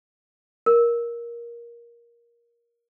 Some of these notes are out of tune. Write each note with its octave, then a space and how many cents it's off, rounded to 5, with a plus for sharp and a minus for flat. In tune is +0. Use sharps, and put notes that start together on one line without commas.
A#4 +15